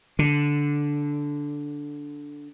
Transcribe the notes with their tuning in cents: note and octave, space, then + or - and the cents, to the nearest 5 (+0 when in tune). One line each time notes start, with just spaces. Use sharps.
D3 -10